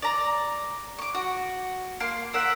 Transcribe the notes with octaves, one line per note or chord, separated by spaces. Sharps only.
D5 A#5
C#6 D6
F#4
A#3 C6
A#4 E5 F#5